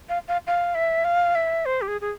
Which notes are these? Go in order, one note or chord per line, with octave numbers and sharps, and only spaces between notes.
F5
F5
F5
E5
F5
E5
C5
G4
G#4
G#4